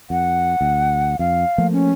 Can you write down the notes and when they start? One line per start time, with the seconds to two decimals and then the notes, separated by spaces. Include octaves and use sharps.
0.10 F2 F#5
0.61 D2
1.19 F2 F5
1.58 F3 A3 A#3
1.72 C#4